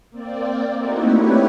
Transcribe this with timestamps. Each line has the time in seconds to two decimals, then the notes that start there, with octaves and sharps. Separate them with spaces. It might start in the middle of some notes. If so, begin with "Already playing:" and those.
0.10 A#3 C4 D5
0.76 A3 A#3 C4 D#4 E4 F#4
1.10 D4 E4 G4 B4 C#5